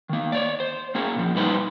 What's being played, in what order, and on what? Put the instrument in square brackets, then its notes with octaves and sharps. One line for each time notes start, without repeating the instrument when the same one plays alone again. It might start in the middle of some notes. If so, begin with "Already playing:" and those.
[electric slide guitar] D#3 A#3
C#5 D5
C5
A#3 C#4 G#4
A#2 F3
A#2 G3 D#4 B4 C5